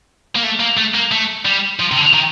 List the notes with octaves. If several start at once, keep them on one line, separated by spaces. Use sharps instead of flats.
A#3
A3
A#3
A3
A#3
A3
G3
F3
C3
D3
D#3